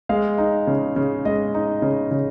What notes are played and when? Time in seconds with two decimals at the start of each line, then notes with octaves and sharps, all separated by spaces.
0.09 G#3 F5
0.38 D#4
0.67 C#3
0.96 C#3
1.25 G#3 D#5
1.54 D#4
1.82 C#3
2.11 C#3